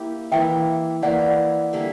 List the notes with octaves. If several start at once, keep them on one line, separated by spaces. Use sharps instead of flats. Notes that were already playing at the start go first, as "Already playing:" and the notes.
Already playing: A#3 E4 G4
E3 A#3 E4 E5 G5
E3 A#3 E4 D5 F#5
D3 G3 A#3 E4